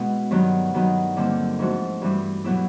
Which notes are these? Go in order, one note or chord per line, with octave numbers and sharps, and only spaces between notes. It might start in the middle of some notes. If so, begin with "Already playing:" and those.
Already playing: B2 G#3 B3 C#4 E4
G2 D#3 F#3 B3
G2 D#3 F#3 B3 D#4
D#2 D3 G3 C4
G#2 F3 A3 D4 F#4
G2 E3 G3
B2 F#3 B3 E4 G4